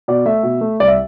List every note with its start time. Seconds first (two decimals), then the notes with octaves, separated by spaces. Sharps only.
0.08 B2 D5
0.26 A3 E5
0.43 B2
0.61 A3
0.79 C2 D5
0.88 E5